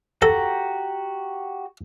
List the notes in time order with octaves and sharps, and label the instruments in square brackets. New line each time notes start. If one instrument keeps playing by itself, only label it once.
[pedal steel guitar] F#4 G4 A#5 [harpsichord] A4